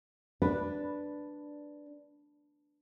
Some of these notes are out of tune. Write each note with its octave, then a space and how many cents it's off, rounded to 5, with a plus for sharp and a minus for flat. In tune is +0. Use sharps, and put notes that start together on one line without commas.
D4 +0 B4 +0